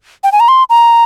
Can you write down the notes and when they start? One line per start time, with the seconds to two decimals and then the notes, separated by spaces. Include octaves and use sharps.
0.24 G5
0.32 G#5
0.40 A#5
0.48 C6
0.70 A#5